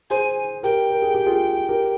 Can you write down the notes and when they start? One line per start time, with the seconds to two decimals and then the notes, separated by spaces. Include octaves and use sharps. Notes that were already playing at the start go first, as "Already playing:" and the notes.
0.10 G#4 C5 G#5
0.63 G4 A#4 G5
0.90 A#4
1.02 G#4
1.15 G4
1.26 F4 G#4
1.68 G4 A#4